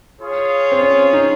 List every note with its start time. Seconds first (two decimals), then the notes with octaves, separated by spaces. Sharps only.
0.20 F4 G#4 C#5 F5
0.72 C4
0.82 C#4
1.13 D#4